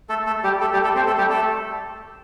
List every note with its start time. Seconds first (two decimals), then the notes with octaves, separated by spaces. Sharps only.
0.09 A3 A4
0.27 A3 A4
0.43 G3 G4
0.61 A3 A4
0.73 G3 G4
0.84 A3 A4
0.95 C4 C5
1.07 A3 A4
1.18 G3 G4
1.30 A3 A4